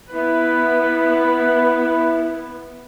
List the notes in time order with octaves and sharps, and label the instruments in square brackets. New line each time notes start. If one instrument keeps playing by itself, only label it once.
[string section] B3 [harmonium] E4 [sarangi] B4